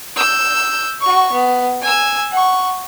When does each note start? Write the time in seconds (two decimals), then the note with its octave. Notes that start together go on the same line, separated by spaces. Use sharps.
0.16 E6 G6
1.01 F#4 C#6
1.32 B3
1.82 G#5 E6
2.31 F#5 C#6